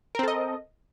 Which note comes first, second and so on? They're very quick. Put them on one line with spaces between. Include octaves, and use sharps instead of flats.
A#4 C4 A4 D#5